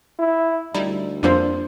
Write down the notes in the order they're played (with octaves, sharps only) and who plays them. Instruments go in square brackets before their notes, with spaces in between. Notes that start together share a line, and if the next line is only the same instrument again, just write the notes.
[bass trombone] E4
[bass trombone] D2 [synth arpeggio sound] G3 D#4 E4
[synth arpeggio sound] F2 G3 A#3 [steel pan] D4 F4 C5